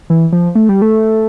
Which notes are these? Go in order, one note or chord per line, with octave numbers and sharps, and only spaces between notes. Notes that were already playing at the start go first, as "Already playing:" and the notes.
E3
F3
A3
G3
A3